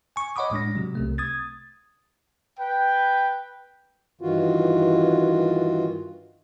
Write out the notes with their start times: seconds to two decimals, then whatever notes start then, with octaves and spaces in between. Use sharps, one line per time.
0.16 G#5 C#6
0.36 C#5 D#5 F#5 B5 D6 D#6
0.51 A2 G#3 D4 A#6
0.75 C3 F#3
0.95 C2 C3 A3
1.18 D#6 G#6 A6
2.59 B4 G5
4.21 G2 D#3 E3 F4 F#4